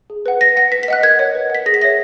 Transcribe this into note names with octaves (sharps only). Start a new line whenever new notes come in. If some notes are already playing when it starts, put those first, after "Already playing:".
G#4
B4 F#5
B4 A#6
F#5 A#6
B4 B6
B6
D#5 F#5 F#6
A#4 G#6
C#5 F#5
B4
F#5 B6
G#4 A#6
B6
C#5 E5 A#6